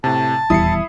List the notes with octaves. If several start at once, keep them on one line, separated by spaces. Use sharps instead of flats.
A2 C3 A5
D#1 E2 G3 E4 D#6 C7 C#7